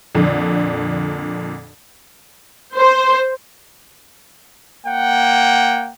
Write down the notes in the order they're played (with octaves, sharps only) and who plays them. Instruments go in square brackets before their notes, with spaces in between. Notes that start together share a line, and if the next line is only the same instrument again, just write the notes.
[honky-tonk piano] F2 A#2 D3
[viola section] C5
[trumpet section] A#3 F#5 G5